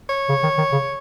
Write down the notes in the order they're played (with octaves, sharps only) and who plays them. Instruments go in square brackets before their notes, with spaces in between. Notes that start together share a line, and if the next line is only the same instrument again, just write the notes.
[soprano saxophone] C#5
[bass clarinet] C#3
D#3
D#3
C#3